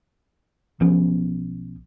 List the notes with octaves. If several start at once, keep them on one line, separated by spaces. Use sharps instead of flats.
B1 F3 B3 C#4